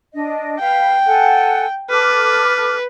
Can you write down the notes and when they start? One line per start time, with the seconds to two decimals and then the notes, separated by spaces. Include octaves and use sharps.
0.13 D4 D#5
0.60 B4 F5 G5
1.06 A4 F#5 G#5
1.90 A4 B4 D6 F6